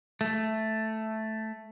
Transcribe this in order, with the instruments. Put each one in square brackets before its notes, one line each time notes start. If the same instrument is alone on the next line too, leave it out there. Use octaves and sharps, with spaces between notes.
[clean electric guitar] A3